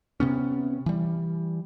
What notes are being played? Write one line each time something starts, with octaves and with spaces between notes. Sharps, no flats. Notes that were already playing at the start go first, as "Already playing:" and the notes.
C3 B3 C#4
E3 G3